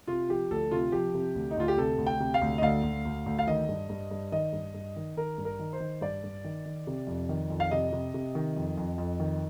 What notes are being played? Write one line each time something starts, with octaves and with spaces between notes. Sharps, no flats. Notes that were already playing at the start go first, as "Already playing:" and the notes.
C3 F4
F3 G4
D2 A4
C3 F4
F3 G4
C3
D2
D#4
D2 F4
G4
C3 A4
D2
G5
C3
F5
D2
D#5
D2 F5
D2
D2
D2
F5
D#3 D#5
G2
G2
G2
D#3 D#5
G2
G2
D#3
D#3 A#4
G2
A#4
D#3
C5
D#3
G2 D5
G2
D#3
D#3
C3
F2
D#3
F2
F5
C3 D#5
C3
C3
D#3
F2
F2
F2
D#3